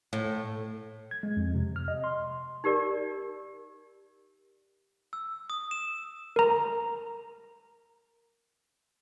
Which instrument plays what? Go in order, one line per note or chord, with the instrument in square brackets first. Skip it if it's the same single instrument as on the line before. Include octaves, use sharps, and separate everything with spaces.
[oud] A2
[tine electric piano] G#6
G#3
F2
C3
F6
D#5
C6
[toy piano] D#4 G4 A#4 D5
[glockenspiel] E6
D#6
E7
[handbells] A#4 A#5